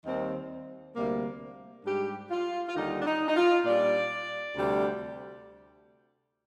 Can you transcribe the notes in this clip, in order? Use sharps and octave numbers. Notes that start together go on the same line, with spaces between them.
D#2 D#3 G3 C4
D2 C3 G3 A#3
G#2 G3 D4 G4
F4
F4
D#2 D3 G3 D#4
D4
D#4
D#4
F4
A#2 G3 D4 D5
D2 C3 G3